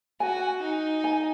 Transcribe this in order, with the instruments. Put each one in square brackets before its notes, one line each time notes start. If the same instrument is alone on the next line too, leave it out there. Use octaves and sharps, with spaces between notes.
[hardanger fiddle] F#4 [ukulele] G#5
[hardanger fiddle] D#4
[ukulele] G#5